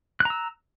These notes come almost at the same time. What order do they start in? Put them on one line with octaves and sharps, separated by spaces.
F#6 A#5 E6